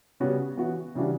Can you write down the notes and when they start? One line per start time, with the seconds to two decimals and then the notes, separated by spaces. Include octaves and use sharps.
0.20 C#3 G3 B3 F#4 C#5
0.57 E3 B3 F#4
0.95 C#3 E3 G3 D4 F#4